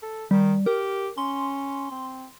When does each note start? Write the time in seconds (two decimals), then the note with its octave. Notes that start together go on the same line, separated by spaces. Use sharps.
0.02 A4
0.31 D#3 G3
0.66 G4 A#4
1.18 C#4 C6
1.92 C4